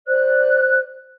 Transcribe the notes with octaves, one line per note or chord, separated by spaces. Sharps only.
C5 D5 F#6